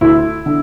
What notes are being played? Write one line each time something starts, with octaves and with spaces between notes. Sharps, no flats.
D2 E4
D3